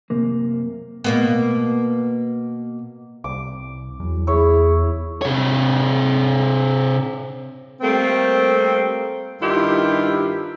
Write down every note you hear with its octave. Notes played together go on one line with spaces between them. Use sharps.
F#2 C3 A#3
B2 A#3 B3
C2 D6
E2 F#3
E4 G#4 C#5
C3 C#5
G3 A3 A#3 C4
G2 D#3 E4 F4 G4